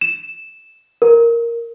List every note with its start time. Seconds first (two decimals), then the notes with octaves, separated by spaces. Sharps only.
0.01 E7
1.02 A#4